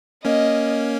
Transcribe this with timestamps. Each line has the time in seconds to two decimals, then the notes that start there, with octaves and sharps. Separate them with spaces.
0.24 A#3 C#4 D#5